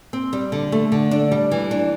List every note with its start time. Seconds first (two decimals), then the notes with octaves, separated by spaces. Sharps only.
0.13 C4
0.33 G3
0.52 D3
0.72 A3
0.92 D3
1.11 D4
1.32 G3
1.51 E3
1.71 D4